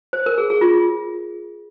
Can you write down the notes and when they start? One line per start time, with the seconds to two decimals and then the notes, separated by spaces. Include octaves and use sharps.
0.13 C5
0.26 A#4
0.38 G#4
0.50 G#4
0.61 F4